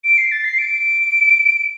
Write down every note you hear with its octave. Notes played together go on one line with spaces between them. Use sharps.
D7
C7
A6
C7
D7